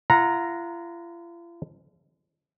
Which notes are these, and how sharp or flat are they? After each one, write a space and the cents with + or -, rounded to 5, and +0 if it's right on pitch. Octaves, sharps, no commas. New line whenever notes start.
F4 -45 F#5 -25 A#5 +0